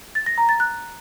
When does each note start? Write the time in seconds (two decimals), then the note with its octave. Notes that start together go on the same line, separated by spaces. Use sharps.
0.15 A6
0.26 A#6
0.38 A#5
0.49 A6
0.60 F#6